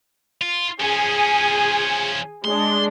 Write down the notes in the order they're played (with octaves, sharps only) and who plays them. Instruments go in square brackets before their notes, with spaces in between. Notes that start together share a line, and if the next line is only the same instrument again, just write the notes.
[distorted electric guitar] F4
[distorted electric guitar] F3 C#4 [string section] G#4 G#5
[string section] G#3 D4 [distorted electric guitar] C6